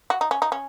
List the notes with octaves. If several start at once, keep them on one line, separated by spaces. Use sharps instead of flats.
F#4
D#4
C#4
D#4
C#4